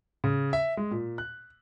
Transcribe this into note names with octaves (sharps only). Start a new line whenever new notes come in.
C#3
E5
G#3
A#2
F#6